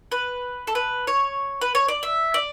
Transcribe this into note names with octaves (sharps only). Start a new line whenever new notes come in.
B4
A4
B4
C#5
B4
C#5
D5
E5
D5